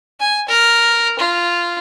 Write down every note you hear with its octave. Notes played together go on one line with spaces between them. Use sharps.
G#5
A#4
F4